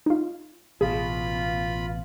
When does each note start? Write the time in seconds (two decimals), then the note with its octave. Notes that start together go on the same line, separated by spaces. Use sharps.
0.06 D#4 F4
0.81 A1 B2 F4 G#4 B5